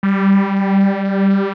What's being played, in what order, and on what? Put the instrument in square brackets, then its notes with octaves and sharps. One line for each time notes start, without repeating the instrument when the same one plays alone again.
[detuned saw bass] G3